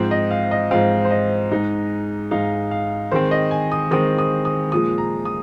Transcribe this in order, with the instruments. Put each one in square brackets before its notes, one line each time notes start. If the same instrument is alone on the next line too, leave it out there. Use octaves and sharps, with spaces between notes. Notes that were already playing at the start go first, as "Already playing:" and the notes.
Already playing: [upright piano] G#2 F3 C4 C5
D#5
F5
D#5
G#2 F3 C4 F5
C5
D#5
G#2 G#3 D#4
G#2 G#3 D#4 F5
F5
D#3 G#3 C4 C5
D#5
G#5
D#6
D#3 G#3 C4 D#6
D#6
D#6
A#2 F3 G#3 D#6
A#5
D#6